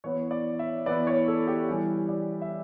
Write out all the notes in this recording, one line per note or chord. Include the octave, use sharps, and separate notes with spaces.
E3 B3 E4 C#5
D5
E5
E3 B3 E4 D5
C#5
A4
G4
E3 G3 C#4 E4 G4
D5
E5